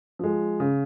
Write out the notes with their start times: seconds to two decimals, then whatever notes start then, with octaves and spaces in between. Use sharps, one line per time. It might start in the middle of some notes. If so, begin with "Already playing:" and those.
0.19 F3 G#3
0.60 C#3